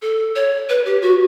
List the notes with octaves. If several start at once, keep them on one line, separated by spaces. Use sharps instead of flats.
A4
C#5
B4
G4
F#4